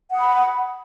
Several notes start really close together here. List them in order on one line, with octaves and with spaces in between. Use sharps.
F#5 D#6 B5